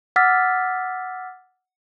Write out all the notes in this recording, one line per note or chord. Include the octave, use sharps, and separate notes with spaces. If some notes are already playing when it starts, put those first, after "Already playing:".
F#5 D6 E6 F6 A6 B6